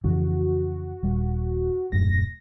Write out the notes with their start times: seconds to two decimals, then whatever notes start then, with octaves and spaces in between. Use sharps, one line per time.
0.04 F2 C#3 E3 F#4
1.03 D#1 G3
1.92 D#1 F#2 A2 A#6